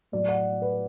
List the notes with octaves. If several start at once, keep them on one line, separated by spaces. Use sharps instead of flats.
A2 F#3 D5
F#5
B4